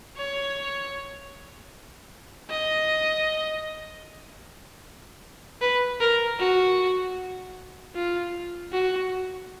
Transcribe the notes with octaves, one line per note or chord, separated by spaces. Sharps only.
C#5
D#5
B4
A#4
F#4
F4
F#4